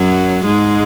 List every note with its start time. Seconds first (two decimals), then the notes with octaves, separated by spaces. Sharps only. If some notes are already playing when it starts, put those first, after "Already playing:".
Already playing: F#2 F#3
0.46 G#2 G#3